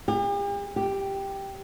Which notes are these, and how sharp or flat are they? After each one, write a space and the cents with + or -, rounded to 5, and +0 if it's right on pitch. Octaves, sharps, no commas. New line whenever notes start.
G4 +45
G4 +0